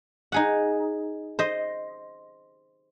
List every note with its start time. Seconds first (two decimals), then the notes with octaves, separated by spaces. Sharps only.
0.32 D#4 G#4 F#5
1.39 C5 D#5